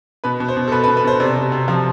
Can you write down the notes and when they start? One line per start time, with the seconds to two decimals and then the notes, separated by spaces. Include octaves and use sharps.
0.24 B2 B4
0.40 B2
0.48 C5
0.57 B2
0.68 A4
0.72 B2 B4
0.84 B4
0.88 B2
0.97 B4
1.04 B2 C5
1.20 C3 D5
1.36 C3
1.52 C3
1.68 F3